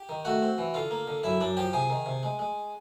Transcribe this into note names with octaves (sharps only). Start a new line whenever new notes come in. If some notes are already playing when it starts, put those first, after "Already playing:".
Already playing: G4 G5
D#3
A3 F#4 F#5
C4
E3
D3 F4 F5
A#3
D3
F#2 E4 E5
F#2 D4 D5
F3 G4 G5
C3 G#4 G#5
D#3
C3
G#3
G#3